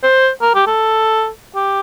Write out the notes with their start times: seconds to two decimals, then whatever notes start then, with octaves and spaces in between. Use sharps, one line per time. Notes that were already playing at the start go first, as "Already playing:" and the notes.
0.03 C5
0.41 A#4
0.55 G4
0.67 A4
1.55 G4